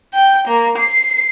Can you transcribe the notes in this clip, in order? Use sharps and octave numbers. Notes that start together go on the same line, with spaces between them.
G5
A#3
C7